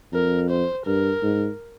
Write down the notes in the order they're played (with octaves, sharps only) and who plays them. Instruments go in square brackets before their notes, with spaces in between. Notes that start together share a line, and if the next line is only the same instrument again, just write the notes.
[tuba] F2 [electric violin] A#4
[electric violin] C5
[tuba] G2 [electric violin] A#4
[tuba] G#2